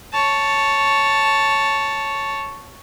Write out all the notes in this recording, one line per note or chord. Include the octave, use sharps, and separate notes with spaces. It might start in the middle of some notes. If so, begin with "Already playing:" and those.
C#5 A5